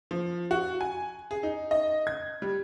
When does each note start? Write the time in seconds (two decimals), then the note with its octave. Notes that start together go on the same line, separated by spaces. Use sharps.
0.11 F3
0.51 F#4
0.81 G#5
1.31 G#4
1.43 D#4
1.71 D#5
2.07 G#6
2.42 G3